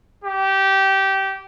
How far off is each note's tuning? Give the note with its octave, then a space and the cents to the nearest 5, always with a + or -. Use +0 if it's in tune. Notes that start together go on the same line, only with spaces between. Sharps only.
G4 -20